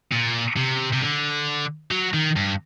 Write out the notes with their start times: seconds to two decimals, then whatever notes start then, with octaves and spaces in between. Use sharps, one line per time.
0.12 A#2
0.56 C3
0.93 C3
1.01 D3
1.91 F#3
2.14 D#3
2.36 G2